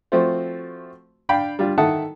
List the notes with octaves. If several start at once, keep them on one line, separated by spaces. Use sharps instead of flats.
F3 A3 C4 F#4 C5
D4 F5 G5 B5
G3 D4 F4
D#3 A4 E5 F#5 A5 D#6